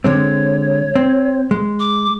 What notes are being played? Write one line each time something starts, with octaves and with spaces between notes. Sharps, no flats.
D3 G#3 C4 C#5
C4
G#3
D6